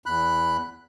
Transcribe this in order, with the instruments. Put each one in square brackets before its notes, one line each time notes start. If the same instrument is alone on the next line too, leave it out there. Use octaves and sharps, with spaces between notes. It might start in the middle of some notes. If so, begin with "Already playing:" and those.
[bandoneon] E2 B5 F#6